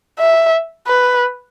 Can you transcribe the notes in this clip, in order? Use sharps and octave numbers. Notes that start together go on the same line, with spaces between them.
E5
B4